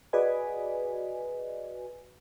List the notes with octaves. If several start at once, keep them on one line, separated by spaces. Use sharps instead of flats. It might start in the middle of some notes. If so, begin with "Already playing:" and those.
F#4 G#4 B4 D5 D#5 G#5